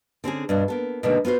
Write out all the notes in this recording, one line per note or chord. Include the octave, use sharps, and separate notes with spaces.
D3 C4 C#4 G#4
G2 B2 D4
A#3 B3 A4
B2 D3 D#3 G#3 A#3
B3 F4 F#4 C5